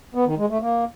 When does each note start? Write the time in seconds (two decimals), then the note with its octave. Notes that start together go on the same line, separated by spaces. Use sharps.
0.15 B3
0.26 D#3
0.38 G#3
0.50 A3
0.61 A#3